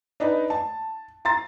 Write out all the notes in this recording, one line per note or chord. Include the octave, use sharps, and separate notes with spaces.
D4 D#4 B4 D#5
A5
A#5 C6 A6